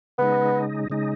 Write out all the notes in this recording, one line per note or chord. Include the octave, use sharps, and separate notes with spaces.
C#3 G#3 B3 D#4
C#3 G#3 D#4